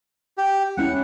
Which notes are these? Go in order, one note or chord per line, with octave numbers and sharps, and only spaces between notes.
G4
G#3 C#4 E4 F#5